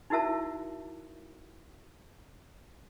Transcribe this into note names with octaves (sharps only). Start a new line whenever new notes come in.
D#4 E4 F#4 A#4 E5 A5